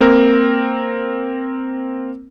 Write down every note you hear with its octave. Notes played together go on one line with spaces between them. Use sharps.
A#3 C4 A#4